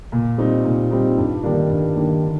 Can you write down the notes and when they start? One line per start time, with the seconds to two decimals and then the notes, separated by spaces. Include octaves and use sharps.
0.12 A#2
0.38 G3 C4 D#4
0.65 A#2
0.91 G3 C4 D#4
1.18 G2
1.43 D#3 G3 A#3 D4
1.70 G2
1.96 D#3 G3 A#3 D4
2.23 D3